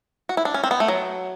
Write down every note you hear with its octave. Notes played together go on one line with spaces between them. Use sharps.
F#4
E4
D4
C#4
C4
B3
A3
F#3